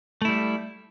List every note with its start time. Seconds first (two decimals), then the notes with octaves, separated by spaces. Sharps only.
0.22 A3
0.25 E4
0.28 G3